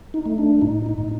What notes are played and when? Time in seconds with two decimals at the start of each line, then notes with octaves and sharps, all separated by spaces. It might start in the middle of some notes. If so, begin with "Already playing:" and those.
0.14 D#4
0.26 A3
0.38 D4
0.61 A2 D#4
0.86 D#4
0.98 A2